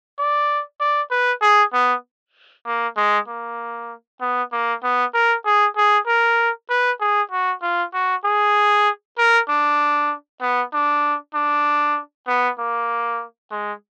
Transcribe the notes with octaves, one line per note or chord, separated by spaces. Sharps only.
D5
D5
B4
G#4
B3
A#3
G#3
A#3
B3
A#3
B3
A#4
G#4
G#4
A#4
B4
G#4
F#4
F4
F#4
G#4
A#4
D4
B3
D4
D4
B3
A#3
G#3